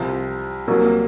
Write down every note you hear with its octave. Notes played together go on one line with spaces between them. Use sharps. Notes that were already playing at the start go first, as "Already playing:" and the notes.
Already playing: C2 C3 F3
C2 A#2 F#3 A#3